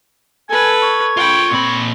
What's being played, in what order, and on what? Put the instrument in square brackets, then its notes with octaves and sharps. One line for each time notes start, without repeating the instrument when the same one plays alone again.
[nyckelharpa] A4 B4 [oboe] G#5
[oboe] C#5
[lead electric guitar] F4 B5 [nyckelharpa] G5 C#6
[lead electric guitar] A#2 B5 [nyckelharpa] C4